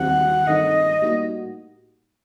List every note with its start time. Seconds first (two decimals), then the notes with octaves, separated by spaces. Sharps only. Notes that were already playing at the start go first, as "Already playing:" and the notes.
Already playing: D#2 D#3 G3 C4 F#4 F#5
0.46 G2 D#3 A3 C4 D#4 D#5
1.01 A2 G3 A#3 D#4 F#4